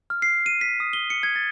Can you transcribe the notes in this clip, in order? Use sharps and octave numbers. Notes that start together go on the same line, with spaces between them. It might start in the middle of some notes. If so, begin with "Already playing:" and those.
F6
C7
D#7
B6
D#6
G7
C#7
G#6
A6